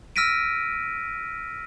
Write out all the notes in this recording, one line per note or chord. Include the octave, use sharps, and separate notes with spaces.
E6 F6 A#6 B6 D7 D#7